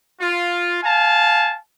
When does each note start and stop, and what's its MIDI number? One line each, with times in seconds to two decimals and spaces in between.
0.21 0.79 65
0.83 1.56 77
0.83 1.56 80
0.83 1.56 81